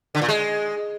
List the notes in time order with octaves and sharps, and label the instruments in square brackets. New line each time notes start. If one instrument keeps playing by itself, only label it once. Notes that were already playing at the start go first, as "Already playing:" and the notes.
[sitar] D3
A#2
G#3